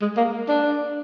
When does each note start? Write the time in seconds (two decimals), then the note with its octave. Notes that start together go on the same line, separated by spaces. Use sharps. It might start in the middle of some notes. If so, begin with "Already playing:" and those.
0.01 G#3
0.17 A#3
0.48 D4